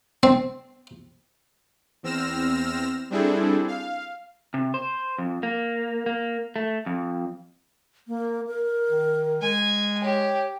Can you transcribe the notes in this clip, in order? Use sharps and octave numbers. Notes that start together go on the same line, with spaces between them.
C4
E2 C4 E6 F6 A#6 E7
G3 C4 D4 E4 G#4 A4
F5
C3
C5
F2
A#3
A#3
A3
F2
A#3
A#4
D#3
G#3 G#5
G4 C#5